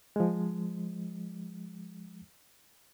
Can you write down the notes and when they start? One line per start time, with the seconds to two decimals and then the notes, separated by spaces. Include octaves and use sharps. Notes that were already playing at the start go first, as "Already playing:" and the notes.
0.16 F3 G#3